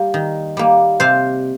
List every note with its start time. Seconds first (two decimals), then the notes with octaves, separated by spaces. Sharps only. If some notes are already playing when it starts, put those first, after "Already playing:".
Already playing: G3 A#3
0.14 D#3
0.57 G3 A#3
1.00 C3 C5 F5